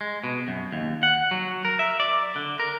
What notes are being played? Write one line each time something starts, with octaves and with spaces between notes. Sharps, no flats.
G#3
B2
F#2
D#2
F#5
F#3
A#4
E5
D5
D3
A#4